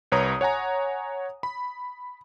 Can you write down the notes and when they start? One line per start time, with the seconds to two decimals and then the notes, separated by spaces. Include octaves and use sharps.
0.12 C2 B4 C#5 A#5 D#6
0.41 C#5 F#5 G#5 A#5
1.43 B5